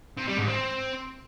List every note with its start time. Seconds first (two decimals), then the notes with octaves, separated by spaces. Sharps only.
0.17 C3
0.27 G3
0.37 G#2
0.47 C4